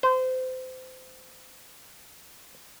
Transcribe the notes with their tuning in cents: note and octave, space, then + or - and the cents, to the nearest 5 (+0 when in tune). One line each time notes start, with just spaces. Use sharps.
C5 -25